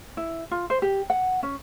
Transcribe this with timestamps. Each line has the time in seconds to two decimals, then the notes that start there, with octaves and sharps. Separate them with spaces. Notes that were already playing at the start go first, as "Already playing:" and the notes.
0.17 E4
0.51 F4
0.70 C5
0.82 G4
1.10 F#5
1.43 C#4